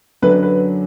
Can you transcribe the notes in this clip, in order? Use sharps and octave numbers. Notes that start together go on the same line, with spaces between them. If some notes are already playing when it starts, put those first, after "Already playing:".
F#2 D3 F#3 D4 B4
B4